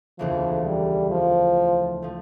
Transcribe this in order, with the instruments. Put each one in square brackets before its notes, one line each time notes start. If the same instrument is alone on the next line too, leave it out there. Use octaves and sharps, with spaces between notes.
[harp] E1 D2 C#3 E3 A#3 [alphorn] F3
[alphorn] G3
F3
[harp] F3 A3